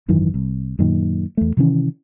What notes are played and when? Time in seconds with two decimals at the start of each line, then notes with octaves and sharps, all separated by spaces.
0.08 G#1 F#2 D#3 E3
0.34 C2
0.79 F#2 A#2 D#3
1.37 E2 A3
1.57 C3 D#3 E3 C#4